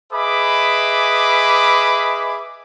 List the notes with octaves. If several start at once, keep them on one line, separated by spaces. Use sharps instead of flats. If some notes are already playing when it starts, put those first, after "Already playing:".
G#4 B4 D#5 E5 B5 D6